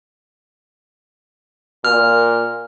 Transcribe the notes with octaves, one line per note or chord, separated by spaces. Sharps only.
A#2 F6